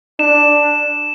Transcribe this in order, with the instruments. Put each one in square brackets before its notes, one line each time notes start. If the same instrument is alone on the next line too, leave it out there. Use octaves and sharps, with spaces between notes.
[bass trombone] D4 [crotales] E7